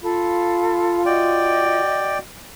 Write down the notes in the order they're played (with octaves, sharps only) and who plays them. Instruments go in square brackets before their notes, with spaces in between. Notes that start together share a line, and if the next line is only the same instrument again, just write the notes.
[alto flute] F4 [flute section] A4 F5 B5
[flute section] F#4 D#5 [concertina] D5 G5